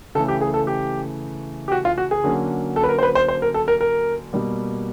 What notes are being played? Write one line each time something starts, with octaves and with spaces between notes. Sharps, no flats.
C#3 E3 A3 A4
G4
G#4
A4
G4
G4
F#4
F4
F#4
G#4
D3 F#3 A#3 C#4
A4
B4
A#4
C5
B4
C5
C5
A#4
A4
A#4
A#4
B2 G3 A#3